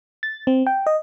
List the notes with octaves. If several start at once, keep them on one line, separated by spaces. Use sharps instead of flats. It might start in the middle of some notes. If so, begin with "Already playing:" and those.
A6
C4
G5
D#5